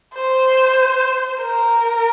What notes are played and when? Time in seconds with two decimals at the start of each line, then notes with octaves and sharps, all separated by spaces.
0.15 C5
1.41 A#4